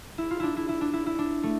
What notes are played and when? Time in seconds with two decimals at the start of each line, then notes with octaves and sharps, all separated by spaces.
0.18 E4
0.31 F4
0.40 D4 E4
0.57 E4
0.69 E4
0.81 D4
0.93 E4
1.06 E4
1.19 D4
1.43 A3